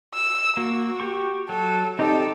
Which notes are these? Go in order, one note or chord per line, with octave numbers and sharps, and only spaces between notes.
E6
A#3 F#4
G4 C#6
F#3 A4
C4 D#4 G4 A4 D5